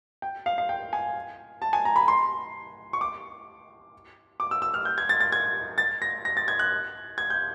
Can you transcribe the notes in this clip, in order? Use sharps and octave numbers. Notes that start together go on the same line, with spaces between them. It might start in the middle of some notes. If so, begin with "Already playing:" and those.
G5
F5
F5
G5
G#5
A5
G#5
A#5
B5
C6
C#6
D6
D6
E6
E6
F6
G6
G#6
A6
A6
G#6
A6
A#6
A#6
A6
G#6
F#6
G#6
G6